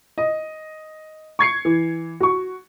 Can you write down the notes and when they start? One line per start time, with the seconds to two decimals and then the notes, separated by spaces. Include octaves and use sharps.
0.18 D#5
1.39 C#6 G#6 C7 C#7
1.65 E3
2.20 F#4 C#6